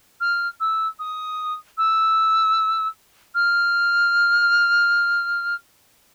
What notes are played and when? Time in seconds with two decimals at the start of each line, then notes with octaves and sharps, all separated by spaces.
0.20 F6
0.60 E6
0.99 D#6
1.77 E6
3.34 F6